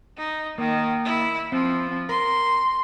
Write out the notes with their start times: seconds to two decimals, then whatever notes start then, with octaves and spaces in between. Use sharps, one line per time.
0.17 D#4
0.58 D#3 A#3
1.05 E4
1.52 F3 C4
2.09 A#4 C6